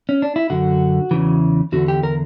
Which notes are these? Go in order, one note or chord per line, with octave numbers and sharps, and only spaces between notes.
C#4
D4
E4
F#2 D3 F#4
E2 C#3 E3
E2 D3 F#4
G4
A#4